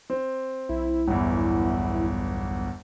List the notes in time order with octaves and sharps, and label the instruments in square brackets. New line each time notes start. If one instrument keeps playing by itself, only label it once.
[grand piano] C4
[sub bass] B1 [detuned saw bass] E4
[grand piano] G1 E2